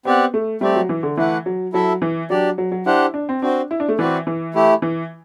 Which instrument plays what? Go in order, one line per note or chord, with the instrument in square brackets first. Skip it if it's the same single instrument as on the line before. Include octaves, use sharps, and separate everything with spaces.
[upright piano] B3 [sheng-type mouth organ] C4 G4 D5 F#5
[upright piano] A3
[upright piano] G3 [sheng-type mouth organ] A3 C4 G4 D5
[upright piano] F#3
E3
D3
[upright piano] E3 [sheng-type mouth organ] A3 E4 B4 F#5
[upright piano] F#3
[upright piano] F#3 [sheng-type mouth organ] E4 A4 E5
[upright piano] E3
[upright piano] F#3 [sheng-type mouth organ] D4 G4 D5
[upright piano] F#3
F#3
[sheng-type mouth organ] D4 G4 C5 F#5 [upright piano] E4
[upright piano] D4
C4
[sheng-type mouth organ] C4 F#4 C5 [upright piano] D4
[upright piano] E4
D4
A3
[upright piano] E3 [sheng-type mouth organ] C4 F#4 B4 D5
[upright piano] E3
[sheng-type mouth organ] A3 E4 G4
[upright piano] E3